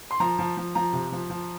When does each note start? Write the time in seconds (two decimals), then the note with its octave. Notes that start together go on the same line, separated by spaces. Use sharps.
0.11 C6
0.20 F3 A#5
0.39 F3
0.57 F3
0.75 F3 A#5
0.93 C3
1.12 F3
1.30 F3